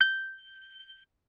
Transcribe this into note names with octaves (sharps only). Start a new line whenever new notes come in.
G6